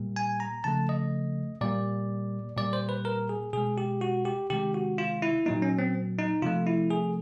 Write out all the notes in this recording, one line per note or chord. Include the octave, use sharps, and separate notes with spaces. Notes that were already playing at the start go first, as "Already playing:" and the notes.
Already playing: A#2 G3 A#3
G#5
A#5
C#3 F3 A3 A5
D#5
A#2 G3 A#3 D5
A#2 G3 A#3 D5
C5
B4
A#4
G#4
B2 G#3 G#4
G4
F#4
G4
C3 D#3 G#3 G4
F#4
F4
E4
A#2 F#3 A#3 D#4
C#4
C4
D#4
C3 F3 A3 F4
E4
G#4